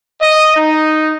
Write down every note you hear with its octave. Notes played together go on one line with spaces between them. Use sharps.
D#5
D#4